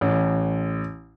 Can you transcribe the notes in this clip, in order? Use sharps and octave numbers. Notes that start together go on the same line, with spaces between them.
A1